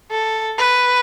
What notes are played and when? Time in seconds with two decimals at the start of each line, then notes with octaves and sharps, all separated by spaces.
0.10 A4
0.58 B4